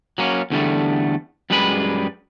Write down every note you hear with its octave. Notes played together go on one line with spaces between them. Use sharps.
F#3 A#3 C#4
E2 D3 G3 A3
F#2 G3 G#3 G#4 B4 B5